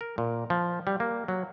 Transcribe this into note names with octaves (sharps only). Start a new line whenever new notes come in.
A#4
A#2
F3
G3
A#3
F#3